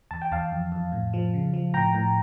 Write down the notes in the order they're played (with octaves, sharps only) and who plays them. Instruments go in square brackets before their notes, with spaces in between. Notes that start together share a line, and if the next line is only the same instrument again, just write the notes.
[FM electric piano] E2 A5
G5
E2 F5 A5
F2
F2
A2
F3
C#3
F3
A2 G5 A#5
A2